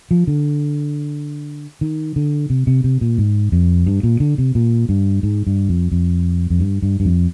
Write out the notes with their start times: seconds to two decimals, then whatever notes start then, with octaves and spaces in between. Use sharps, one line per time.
0.11 F3
0.27 D3
1.81 D#3
2.16 D3
2.50 C3
2.67 C3
2.84 C3
3.01 A#2
3.18 G#2
3.52 F2
3.87 G2
4.03 A#2
4.20 D3
4.38 C3
4.55 A#2
4.89 G2
5.23 G#2
5.47 G2
5.69 F2
5.92 F2
6.50 F2
6.60 G2
6.82 G2
7.00 G2
7.05 F2